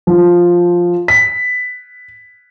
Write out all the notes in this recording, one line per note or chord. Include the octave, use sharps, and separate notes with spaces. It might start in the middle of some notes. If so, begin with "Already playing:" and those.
F3
B6